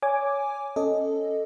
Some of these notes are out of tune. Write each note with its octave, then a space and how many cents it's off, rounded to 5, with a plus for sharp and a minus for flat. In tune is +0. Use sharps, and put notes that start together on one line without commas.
C#5 +15 G#5 +0 D6 +0
C#4 +0 A4 +0 D#5 +0